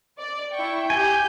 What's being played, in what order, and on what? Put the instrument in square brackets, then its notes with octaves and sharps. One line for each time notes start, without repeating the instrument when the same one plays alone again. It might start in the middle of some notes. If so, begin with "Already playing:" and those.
[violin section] D5
E4 G5 C#6
[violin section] G4 G6 [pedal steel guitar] G#5